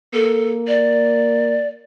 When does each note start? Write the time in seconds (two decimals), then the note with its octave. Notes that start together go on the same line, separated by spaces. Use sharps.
0.14 A#3 A4
0.68 D5